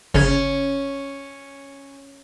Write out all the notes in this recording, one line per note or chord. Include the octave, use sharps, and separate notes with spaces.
G1 C#3 C#4 G#6